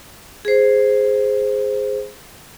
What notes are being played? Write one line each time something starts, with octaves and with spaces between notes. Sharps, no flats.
G#4 C5